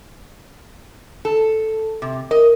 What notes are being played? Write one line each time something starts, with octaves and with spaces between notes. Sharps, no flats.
A4
C3
A#4 D#5